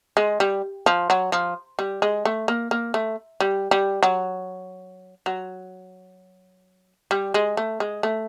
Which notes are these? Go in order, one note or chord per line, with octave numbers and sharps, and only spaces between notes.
G#3
G3
F3
F#3
F3
G3
G#3
A3
A#3
A#3
A3
G3
G3
F#3
F#3
G3
G#3
A3
G#3
A3